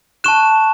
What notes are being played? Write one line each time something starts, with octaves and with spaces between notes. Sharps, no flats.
A5 C#6 F#6 E7